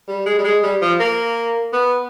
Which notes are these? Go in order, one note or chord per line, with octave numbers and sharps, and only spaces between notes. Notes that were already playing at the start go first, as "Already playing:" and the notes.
G3
G#3
G3
G#3
G3
F3
A#3
B3